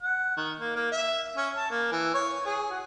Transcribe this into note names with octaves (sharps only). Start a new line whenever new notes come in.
F#5
D#3
A#3
A#3
E5
C#4
A5
A#3
E3
C#5
G#4
F#4